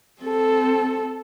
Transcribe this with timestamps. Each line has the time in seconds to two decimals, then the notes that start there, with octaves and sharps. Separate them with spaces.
0.22 C4 A4